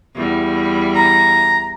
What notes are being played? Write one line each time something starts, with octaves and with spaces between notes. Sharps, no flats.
E2 G3
A#5